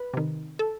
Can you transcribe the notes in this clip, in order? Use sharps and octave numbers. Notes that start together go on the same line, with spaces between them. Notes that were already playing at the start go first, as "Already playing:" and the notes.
Already playing: B4
C3 D#3
A4